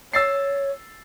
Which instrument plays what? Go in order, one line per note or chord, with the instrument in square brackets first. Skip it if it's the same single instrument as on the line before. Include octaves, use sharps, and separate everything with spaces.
[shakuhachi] C#5 [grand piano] E6 A6 C7